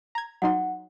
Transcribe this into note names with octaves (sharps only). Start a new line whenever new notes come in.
A#5 G#6
F#3 D#4 F#5 C6